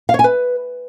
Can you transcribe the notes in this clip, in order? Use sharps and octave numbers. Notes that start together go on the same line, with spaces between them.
F5
C#5
G#5
B4